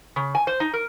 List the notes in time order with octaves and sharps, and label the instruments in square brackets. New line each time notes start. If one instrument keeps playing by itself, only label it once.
[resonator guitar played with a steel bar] C#3
G#5
C5
D#4
A#4